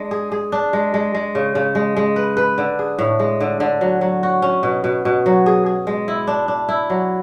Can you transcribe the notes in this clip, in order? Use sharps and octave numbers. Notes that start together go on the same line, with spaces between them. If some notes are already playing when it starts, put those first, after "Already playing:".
Already playing: G#3 D4
G#4
G#4
D4
G#3
G#3
G#3
C#3
C#3
G#3
G#3
B4
B4
D3
G#4
A2
G#3
D3
D3
F#3
F#3
F#4
C#4
B2
B2
B2
F#3
G#4
G#4
G#3
E4
D4
D4
E4
F#3